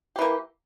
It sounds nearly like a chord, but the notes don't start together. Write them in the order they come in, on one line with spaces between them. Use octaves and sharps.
G4 E3 A#3